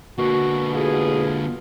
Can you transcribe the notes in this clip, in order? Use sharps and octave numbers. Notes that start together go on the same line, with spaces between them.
B2 D3 A#3 F#4
A1 F4 G#4